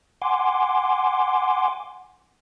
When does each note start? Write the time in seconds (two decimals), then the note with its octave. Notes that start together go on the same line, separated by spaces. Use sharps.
0.22 F#5 G#5 C6 D6